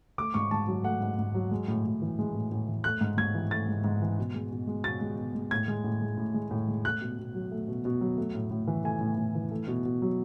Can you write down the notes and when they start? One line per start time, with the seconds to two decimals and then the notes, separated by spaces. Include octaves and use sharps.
0.18 A3 D6
0.34 G#2 C#6
0.51 G#2 A5
0.67 F#3
0.84 A3 F#5
1.01 G#2
1.19 G#2
1.35 F#3
1.51 G#3
1.68 A2
1.85 A2
2.02 E3
2.19 G#3
2.35 A2
2.52 A2
2.68 E3
2.84 A3 F#6
3.01 G#2
3.17 G#2 G#6
3.35 E3
3.51 A3 A6
3.69 G#2
3.84 G#2
4.02 E3
4.18 B2
4.34 G#3
4.51 B2
4.67 G#3
4.84 B2 A6
5.01 G#3
5.17 B2
5.35 G#3
5.51 A2 G#6
5.68 G#3
5.84 A2
6.02 G#3
6.17 A2
6.34 G#3
6.51 A2
6.68 G#3
6.84 A3 F#6
7.01 B2
7.18 B2
7.35 F#3
7.51 A3
7.68 B2
7.85 B2
8.01 F#3
8.17 A3
8.35 A2
8.51 A2
8.67 E3
8.84 A3 G#5
9.01 A2
9.17 A2
9.35 E3
9.51 A3
9.67 B2
9.85 B2
10.02 F#3